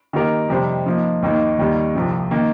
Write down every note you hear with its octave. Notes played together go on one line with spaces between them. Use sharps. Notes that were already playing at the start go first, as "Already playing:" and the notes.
D#3 A#3 G4 A#4
F2 C3 G3 D#4 C5
F3 A#3 D#4
D#2 D#3 A#3 D#4
D#2 D#3 G3 A#3
C2 C3 F3
D#3 A#3